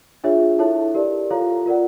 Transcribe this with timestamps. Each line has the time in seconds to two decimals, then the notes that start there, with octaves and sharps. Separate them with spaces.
0.24 D4 F4 G#4 C#5 E5
0.59 E4 A4 C#5 E5 A5
0.94 G4 A#4 D5
1.30 F4 A4 C#5 F5 A#5
1.66 F4 A#4 D5 F#5